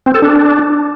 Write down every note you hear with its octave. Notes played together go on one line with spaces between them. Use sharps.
C4
A4
D4